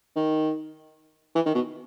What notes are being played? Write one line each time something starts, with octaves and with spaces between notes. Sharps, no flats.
D#3
E3
D#3
B2